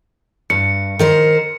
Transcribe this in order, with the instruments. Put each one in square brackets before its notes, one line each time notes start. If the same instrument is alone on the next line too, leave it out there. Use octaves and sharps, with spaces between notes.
[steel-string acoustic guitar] G2 [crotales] C#7
[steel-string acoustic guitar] D#3 A#4 C5